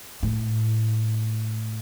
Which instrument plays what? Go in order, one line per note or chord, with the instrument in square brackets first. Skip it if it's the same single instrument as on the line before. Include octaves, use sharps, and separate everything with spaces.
[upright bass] A2